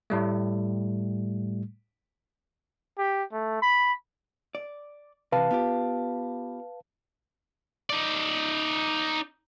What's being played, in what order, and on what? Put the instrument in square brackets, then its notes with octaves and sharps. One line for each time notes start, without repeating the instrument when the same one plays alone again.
[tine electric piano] A2 G3 A3
[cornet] G4
A3
B5
[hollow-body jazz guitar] D5
[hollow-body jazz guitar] C3 E3 [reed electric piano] B4 F5 A5
[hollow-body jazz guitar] B3 F4 G4
[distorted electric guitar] D#4 D5